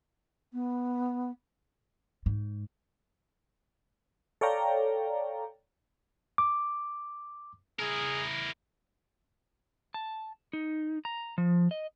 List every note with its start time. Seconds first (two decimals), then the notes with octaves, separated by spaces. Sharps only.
0.53 B3
2.26 G#2
4.41 A4 C#5 D5 F5 G5 A#5
6.38 D6
7.79 E4 G#4 A#4
9.94 A5
10.53 D#4
11.05 A#5
11.38 F3
11.71 D#5